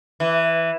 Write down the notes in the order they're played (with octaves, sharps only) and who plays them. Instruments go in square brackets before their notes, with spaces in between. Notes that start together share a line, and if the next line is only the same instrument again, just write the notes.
[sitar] E3